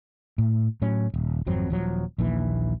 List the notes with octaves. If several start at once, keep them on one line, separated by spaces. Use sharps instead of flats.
A2
A2 F#3 C#4
D#1
G#1 F2 F#3 C4
D#1 F3 F#3
A#1 D#2 E3